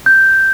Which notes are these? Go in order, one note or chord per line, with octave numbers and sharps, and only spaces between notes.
G6